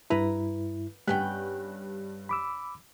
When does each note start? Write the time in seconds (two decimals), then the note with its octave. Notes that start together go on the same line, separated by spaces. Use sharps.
0.10 G2 E4 B4 A#5
1.08 G2 B3 C#4 G5 F#6
2.29 B5 D6 E6